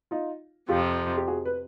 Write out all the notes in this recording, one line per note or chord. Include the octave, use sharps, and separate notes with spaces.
D#4 F4
F2 C3 F3 F4 G4
G4
F#4 G#4
B4